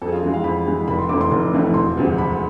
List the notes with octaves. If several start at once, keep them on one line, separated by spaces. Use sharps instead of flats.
F2 A4
G#4
F4
E3 G#3 G#4
F5
F2 B5
E3 G#3
F1 B5
C6
F2 E3 A3 D6
C6
F1
F2 E3 A3
E1 C6
D2 C3 F3 G#3
E1 B5